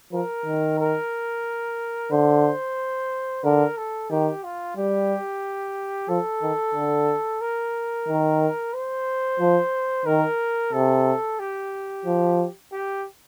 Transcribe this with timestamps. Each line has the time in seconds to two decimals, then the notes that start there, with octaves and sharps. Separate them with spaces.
0.12 F3 A#4
0.46 D#3
0.79 A#4
2.11 D3 C5
3.44 D3 A#4
3.77 A4
4.10 D#3 G4
4.44 F4
4.76 G3 G4
6.09 F3 A4
6.43 D#3
6.74 D3
7.41 A#4
8.08 D#3
8.74 C5
9.40 F3
10.06 D#3 A#4
10.72 C3 A4
11.39 G4
12.06 F3
12.72 G4